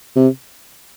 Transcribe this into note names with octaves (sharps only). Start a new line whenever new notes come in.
C3